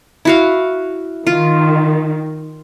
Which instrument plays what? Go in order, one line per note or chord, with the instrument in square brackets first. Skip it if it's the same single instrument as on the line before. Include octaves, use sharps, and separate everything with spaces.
[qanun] E4 F#4 F5
[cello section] D#3 [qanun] F4